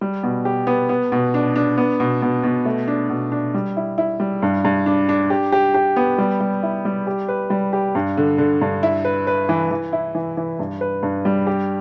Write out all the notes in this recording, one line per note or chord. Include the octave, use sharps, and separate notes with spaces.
G3
B2
G4
B3
B3
B2
D4
D4
B3
B2
B2
B2
A3
D4
B2
D4
G3
E4
E4
G3
G2
G2
D4
D4
G4
G4
G4
B3
G3
G3
E4
G3
G4
B4
G3
G4
G2
D3
D3
G2
E4
B4
B4
E3
E3
E4
E3
E3
G2
B4
G2
G3
G4